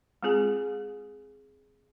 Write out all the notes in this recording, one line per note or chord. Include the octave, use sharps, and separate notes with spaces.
G#3 C4 F4 G#4 G#5